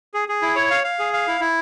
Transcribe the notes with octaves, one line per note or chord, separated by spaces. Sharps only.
G#4
G#4
E4
C#5
F5
F5
G#4
F5
E4
E4